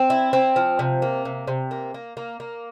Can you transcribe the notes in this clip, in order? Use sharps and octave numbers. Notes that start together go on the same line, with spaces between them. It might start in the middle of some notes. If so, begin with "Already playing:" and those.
Already playing: C4
E4
C4
F3
C3
A#3
C3
C3
A#3
A#3
A#3
A#3